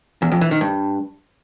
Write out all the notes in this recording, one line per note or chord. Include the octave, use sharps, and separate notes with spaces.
E2
F2
E3
D#3
G2